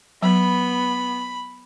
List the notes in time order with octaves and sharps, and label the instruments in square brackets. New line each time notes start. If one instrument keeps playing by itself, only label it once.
[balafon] F#3 [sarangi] B3 [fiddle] B5